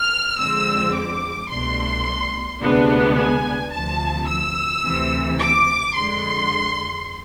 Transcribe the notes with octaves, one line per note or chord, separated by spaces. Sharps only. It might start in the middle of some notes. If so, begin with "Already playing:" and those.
Already playing: F6
F2 D3 F3 G#3 C4 E6
D6
C2 B2 A3 D4 C6
D2 C3 G#3 B3 D4
G#5
D2 C3 F3 A5
E6
D2 C3 E3
D6
F2 D3 G#3 C6